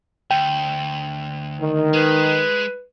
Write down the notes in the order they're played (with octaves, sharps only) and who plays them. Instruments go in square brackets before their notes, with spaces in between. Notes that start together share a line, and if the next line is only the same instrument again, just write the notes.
[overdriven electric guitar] D2 [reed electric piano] G5
[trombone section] D#3
[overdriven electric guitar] G#3 [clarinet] B4